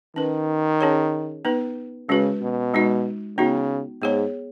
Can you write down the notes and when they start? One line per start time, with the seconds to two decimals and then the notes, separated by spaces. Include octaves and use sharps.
0.16 D#3 C#4 B4
0.81 C#4 G#4 C#5
1.45 B3 D#4 B4
2.08 C#3 G#3 C#4 F#4 B4
2.41 B2
2.74 G#3 D#4 F#4
3.38 C#3 B3 D#4 F#4
4.02 G#2 B3 G#4 C#5